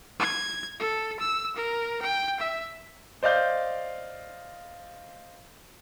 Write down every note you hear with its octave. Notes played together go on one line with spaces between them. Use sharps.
G#6
A4
E6
A#4
G5
E5
C5 D5 D#5 F5 G6